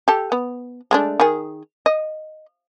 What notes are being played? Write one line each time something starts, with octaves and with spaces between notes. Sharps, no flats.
G4 A4
B3
G#3 A3 D4
D#3 G#4
D#5